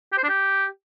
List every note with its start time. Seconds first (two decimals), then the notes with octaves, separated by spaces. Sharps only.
0.12 G4
0.18 C5
0.23 D4
0.29 G4